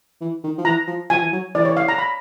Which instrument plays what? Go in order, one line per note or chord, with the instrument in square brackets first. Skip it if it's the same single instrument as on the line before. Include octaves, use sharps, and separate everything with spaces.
[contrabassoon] E3
D#3
F3
[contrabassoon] E3 [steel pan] A#5
[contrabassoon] F3
[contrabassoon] F3 [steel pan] G#5
[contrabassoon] E3
F#3
[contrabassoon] E3 [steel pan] D5
[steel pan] C#5
F5
A#5
B5